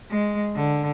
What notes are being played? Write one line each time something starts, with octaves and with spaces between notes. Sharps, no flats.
G#3
D3